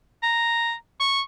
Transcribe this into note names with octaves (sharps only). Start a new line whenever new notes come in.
A#5
C#6